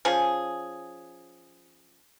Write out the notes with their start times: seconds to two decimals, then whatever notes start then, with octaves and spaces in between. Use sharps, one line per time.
0.05 F3 C#4 G#4